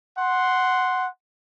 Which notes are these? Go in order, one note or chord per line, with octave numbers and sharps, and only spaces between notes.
F#5 C6